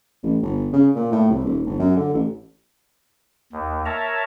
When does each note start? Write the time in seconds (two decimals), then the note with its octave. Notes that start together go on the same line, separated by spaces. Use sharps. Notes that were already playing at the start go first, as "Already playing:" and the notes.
0.23 A1
0.42 G1
0.73 C#3
0.95 A#2
1.12 A2
1.29 C2
1.44 D#1
1.66 G1
1.79 F#2
1.97 D3
2.13 A1
3.53 D#2
3.85 A#4 C#5 E5 A5 A#5